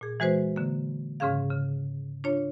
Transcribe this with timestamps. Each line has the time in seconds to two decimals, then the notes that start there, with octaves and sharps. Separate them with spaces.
0.01 A#2 G#4
0.20 E3 G#3 F#4 B4 C5
0.56 D3 A#3
1.20 G#2 C#3 C#4 G#4 F5
1.50 C#3
2.24 D4 F4 C#5